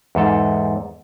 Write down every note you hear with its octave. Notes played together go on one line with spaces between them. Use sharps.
E2 G#2 A4